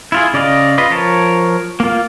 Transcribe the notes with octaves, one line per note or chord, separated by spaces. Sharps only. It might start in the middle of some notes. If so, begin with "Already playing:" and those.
E4 F4 G#4
C#3 D5 D#5 F5
F4 B4 D#5
F3 A#4 C#5 A5
A#3 F4